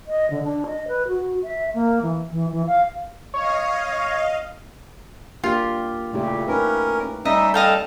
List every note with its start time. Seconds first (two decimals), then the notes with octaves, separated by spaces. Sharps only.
0.07 D#5
0.30 D3
0.43 D4
0.66 D#5
0.88 B4
1.08 F#4
1.43 E5
1.74 A#3
2.02 E3
2.31 E3
2.52 E3
2.67 F5
3.34 C#5 D#5 F5
5.44 A#3 D4 F4 G4
6.13 A#2 C#3 A3 E4 G4
6.48 C#4 D#4 A#4 B4
7.25 G3 C#4 D#4 D#5 E5
7.54 A4 D#5 F5 G5 A5